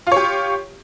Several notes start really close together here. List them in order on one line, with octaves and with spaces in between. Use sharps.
F4 C#5 G4